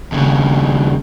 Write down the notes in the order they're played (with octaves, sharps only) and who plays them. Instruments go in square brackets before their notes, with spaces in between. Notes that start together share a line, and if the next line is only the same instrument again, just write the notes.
[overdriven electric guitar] D#2 C#3